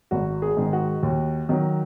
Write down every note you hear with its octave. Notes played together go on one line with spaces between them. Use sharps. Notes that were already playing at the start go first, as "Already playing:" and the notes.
G#1 F#4
G#4
G#2 D#3
F#4
D#2
D#3 F#3